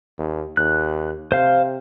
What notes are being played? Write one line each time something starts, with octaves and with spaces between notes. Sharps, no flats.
D#2
D#2 F#6
C3 C5 F5